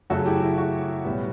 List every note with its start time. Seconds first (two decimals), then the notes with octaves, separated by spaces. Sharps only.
0.10 F#2 C#3 F#3 A3 F#4 A4
0.26 E4 G4
0.42 E4
0.58 F#4
1.05 B1 A2 G3 B3